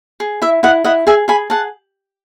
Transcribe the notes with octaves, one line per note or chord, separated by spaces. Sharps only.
G#4
E4 E5
E4 D#5 F#5
E4 D#5 F#5
G#4 E5 G#5
G#4 G#5 B5
G#4 F#5 A5